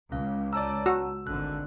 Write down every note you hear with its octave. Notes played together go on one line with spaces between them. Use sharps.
C#2 C#4 F5
C#5 D5 A5 A#5 E6
F#4 E6
G#1 D3 F#6